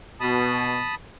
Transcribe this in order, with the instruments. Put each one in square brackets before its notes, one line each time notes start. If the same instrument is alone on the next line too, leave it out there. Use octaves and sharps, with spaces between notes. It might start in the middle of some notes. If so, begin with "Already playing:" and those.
[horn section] B2 [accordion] A5 B5 D#6